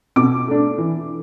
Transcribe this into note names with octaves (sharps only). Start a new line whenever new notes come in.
B2 D6
A3 D4
E3